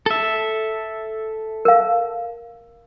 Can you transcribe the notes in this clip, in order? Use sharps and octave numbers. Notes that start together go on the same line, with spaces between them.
A4 E5
A#4 F5